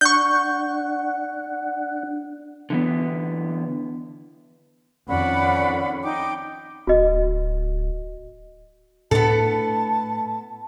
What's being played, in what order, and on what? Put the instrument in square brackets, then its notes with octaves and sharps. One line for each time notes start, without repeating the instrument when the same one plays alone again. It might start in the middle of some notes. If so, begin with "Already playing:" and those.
[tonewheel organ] D4 F#5 [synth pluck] C#6 G6
[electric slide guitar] D3 E3 B3
[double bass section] F2 D#3 C#4 [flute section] D5 F#5 B5
[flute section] D#4 G5 D6
[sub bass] D1 [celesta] F#4 D#5
[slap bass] A2 D4 [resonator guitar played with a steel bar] B3 A4 [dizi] A5